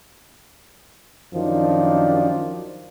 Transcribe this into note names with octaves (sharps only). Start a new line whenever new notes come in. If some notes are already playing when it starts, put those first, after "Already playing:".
F#2 D#3 F3 D4